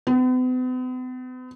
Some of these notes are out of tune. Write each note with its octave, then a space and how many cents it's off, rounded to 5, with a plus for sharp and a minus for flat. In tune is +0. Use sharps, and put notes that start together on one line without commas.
B3 +45